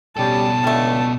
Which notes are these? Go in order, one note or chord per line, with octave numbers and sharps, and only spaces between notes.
B2 G3 C#4 G4 A4 A5
C#2 D3 G3 A3